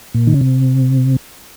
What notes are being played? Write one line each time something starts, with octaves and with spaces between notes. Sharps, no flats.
A#2
D#3
C#3
C3